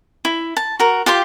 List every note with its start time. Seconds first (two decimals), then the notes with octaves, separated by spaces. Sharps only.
0.25 E4
0.57 A5
0.79 F#4 A#4
1.06 F4 G4 G5 C6